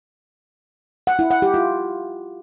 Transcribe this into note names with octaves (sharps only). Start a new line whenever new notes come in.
F#5
E4
F#5
G4
F4